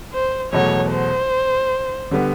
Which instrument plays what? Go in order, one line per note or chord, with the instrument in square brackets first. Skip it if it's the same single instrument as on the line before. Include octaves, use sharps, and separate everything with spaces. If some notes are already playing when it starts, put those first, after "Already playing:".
[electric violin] C5
[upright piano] E2 B2 F#3 A3 [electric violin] C#5
[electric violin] C5
[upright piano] D3 G3 B3